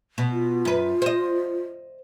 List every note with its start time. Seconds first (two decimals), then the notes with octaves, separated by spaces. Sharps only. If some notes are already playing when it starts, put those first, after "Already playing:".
0.18 B2
0.32 F4
0.65 F#2 B4
1.02 C5 D#5